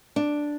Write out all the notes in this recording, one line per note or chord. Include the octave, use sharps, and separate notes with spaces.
D4